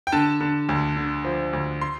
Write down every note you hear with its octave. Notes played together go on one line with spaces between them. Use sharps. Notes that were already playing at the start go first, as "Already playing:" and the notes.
G5
D3 A5
D3
D2
D3
F3
D2
C6